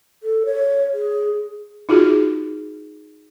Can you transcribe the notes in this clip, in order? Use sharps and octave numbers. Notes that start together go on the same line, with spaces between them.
A4
C#5
G#4
D#4 F4 F#4 G#4